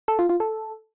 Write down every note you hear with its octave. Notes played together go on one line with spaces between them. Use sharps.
A4
F4
F4
A4